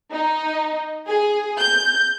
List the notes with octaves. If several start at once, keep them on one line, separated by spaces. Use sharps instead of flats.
D#4
G#4
G6